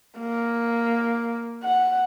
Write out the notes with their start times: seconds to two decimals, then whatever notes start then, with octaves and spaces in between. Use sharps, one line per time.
0.19 A#3
1.63 F#5